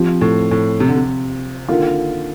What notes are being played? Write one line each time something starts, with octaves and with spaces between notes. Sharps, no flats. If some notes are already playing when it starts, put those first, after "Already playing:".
Already playing: F3 C4 G4
A2
A2
C3
D3
C3
D3 D#3 A#3 F4